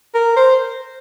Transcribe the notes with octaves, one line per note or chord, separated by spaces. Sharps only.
A#4
C5